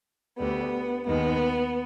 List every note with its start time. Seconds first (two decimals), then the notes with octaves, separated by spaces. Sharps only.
0.37 D2 D3 G3 B3
1.07 D#2 D#3 G#3 B3